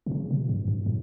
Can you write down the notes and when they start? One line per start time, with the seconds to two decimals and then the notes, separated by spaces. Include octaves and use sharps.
0.06 B2
0.11 C#3
0.31 B2
0.49 G2
0.68 G2
0.86 A2